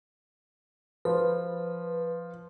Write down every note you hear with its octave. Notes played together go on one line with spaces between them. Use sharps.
F3 B4